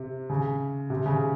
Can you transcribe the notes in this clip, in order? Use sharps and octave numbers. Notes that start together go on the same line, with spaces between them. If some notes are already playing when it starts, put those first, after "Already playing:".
Already playing: C3
C#3
C3
C#3